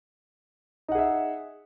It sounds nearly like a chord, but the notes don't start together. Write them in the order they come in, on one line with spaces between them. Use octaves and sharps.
D#4 F#5 G#4 E5